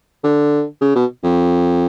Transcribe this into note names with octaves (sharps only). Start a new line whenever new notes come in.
D3
C#3
B2
F2